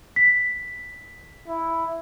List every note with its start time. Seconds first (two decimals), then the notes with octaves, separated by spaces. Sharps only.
0.16 B6
1.48 E4